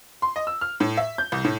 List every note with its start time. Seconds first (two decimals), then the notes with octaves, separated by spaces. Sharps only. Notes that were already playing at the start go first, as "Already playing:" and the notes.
0.22 C6
0.36 D#5
0.47 E6
0.61 F6
0.80 A2
0.97 E5
1.18 G6
1.32 C2
1.45 A2